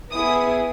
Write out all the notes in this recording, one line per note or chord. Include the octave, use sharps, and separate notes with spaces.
B3 E4 G#4 D#6